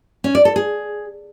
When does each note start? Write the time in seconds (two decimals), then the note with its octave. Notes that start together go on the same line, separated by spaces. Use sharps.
0.24 C#4
0.35 D5
0.45 A4
0.56 G#4